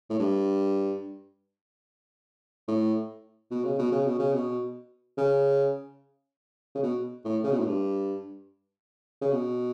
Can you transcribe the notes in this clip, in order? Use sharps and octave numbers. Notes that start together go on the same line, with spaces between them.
A2
G2
A2
B2
C#3
B2
C#3
B2
C#3
B2
C#3
C#3
B2
A2
C#3
B2
A2
G2
C#3
B2